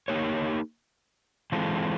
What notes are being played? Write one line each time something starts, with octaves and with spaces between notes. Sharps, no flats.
A#3 D#4 G4 A#4 C#5
E3 G#3 C4 F4 A4